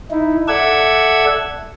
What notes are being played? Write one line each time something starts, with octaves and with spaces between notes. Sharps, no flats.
D#4 E4
A4 D5 E5 F#5 E6 G#6